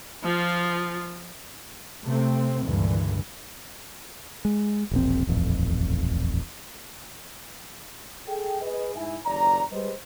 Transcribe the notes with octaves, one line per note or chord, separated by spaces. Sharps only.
F3 F4
C3 A3 C4
C#2 G2 A#2 D3 E3
G#3
E1 A#1 C4
D#1 A1 F2
G#4 A4 G5
G#4 B4 D#5
G#2 E4 E5 G#5
F#1 D#2 D5 A#5
G3 G#3 G4 B4 C5 D#5